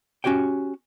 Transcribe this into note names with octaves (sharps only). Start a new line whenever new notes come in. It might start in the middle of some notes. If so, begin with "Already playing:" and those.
C#4 F#4 G4 C#5 G5